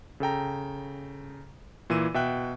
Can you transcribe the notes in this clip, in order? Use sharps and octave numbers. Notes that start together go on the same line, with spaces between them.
C#3 A4 G5 A#5
A#2 E3 E6 D#7
B2 E5 G5 F#6